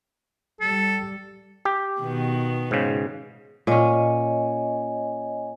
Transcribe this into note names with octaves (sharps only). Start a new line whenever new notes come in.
G3 A4
G4
B2 D#3 B3
G#2 C#3
A#2 C#4 C#5 D#5 G#5